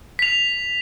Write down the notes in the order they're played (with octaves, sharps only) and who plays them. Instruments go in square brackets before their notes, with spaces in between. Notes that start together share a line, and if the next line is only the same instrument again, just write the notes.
[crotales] B6 F7